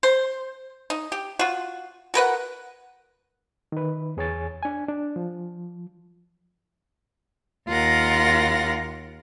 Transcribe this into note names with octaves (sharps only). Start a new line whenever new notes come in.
C5
D#4
G4
F4 F#4
F#4 A#4 B4 F#5
D#3 B4
E2 G#4 C#5 G#5 A6
D4 G#5
D4
F3
D#2 F4 A#4 F#5 A#6